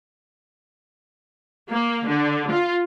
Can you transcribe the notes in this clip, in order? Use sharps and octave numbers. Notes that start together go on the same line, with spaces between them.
A#3
D3
F4